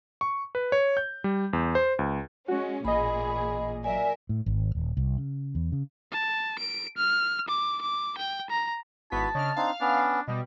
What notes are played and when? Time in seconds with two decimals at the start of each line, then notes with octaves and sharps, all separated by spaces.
0.21 C#6
0.55 B4
0.72 C#5
0.97 G6
1.24 G3
1.53 E2
1.75 C5
1.99 C#2
2.48 G#3 C#4 F#4
2.85 A1 A#2 G#4 D#5 B5
3.84 F#3 A#4 D5 E5 G#5
4.29 A2
4.46 G#1
4.75 D#1
4.97 C2
5.18 C#3
5.55 E2
5.72 C#3
6.12 A5
6.59 D7
6.98 F6
7.48 D6
7.81 D6
8.18 G5
8.50 A#5
9.12 G#1 B3 E4 F#4 A5 B6
9.35 C#3 D4 C#5 D#5 F6
9.56 C4 D4 D#4 F5
9.81 B3 C#4 D4
10.28 B2 G3 D#5